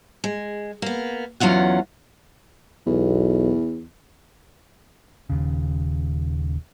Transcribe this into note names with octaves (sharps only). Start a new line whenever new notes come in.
G#3
A#3 B3
E2 F#3 C#4 F4 F#5
B1 E2
D#1 D#2 C#3